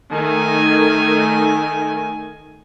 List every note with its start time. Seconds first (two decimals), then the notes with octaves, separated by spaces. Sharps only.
0.13 D#3 A3 G#5